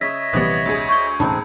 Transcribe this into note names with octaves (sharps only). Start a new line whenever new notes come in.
C#3 C#5 D#5 E5 E6 A#6 B6
A#1 C3 E3 G3 B3 D#6
D2 G#4
C#6 G6 G7
E1 A2 C#3 C4 D4 D#4 A5 B5